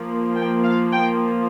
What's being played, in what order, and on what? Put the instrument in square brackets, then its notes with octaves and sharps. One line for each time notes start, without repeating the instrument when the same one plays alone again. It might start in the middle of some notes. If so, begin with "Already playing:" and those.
Already playing: [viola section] F3 A#3
G5
F5
G5